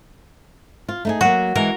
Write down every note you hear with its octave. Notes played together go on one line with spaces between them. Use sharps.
F4
A3 D#4 G#4
F#3 A#3 F#4
E3 G#3 A#4